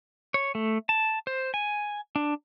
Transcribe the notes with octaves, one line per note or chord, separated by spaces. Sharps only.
C#5
A3
A5
C5
G#5
D4